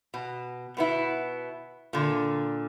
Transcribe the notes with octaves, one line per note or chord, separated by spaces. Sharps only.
B2
B2 B3 E4
A#2 D3